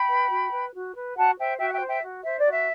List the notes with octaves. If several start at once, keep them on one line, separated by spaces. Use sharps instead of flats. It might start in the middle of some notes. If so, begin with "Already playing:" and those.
Already playing: G5 B5
B4
F#4
B4
F#4
B4
F#4 F#5 A5
C5 E5 G5
F#4 E5 G5
F#5
E5 G5
C5
E5 G5
F#4
C5 E5
D5
F#4
E5